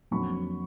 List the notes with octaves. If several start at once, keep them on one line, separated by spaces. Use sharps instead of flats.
F2 D3 F#3 A#3 B5 C#6